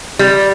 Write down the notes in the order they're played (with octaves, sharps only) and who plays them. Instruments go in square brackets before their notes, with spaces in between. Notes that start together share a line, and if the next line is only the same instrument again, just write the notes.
[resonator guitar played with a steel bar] G3